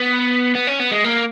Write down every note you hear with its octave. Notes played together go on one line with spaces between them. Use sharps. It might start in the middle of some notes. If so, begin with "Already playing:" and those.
Already playing: B3
B3
C#4
B3
G#3
A#3